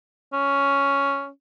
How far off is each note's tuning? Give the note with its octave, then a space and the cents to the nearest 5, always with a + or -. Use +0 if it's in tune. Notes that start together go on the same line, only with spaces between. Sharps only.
C#4 +5